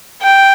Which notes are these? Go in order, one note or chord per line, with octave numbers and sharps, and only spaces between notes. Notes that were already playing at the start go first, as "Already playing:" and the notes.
G5